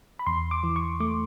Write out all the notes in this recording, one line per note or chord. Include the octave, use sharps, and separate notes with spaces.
B5
E2 C6
D6
E3
C#6
A3 D6